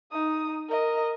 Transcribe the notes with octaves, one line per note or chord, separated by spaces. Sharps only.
D#4 D#6
A#4 D#5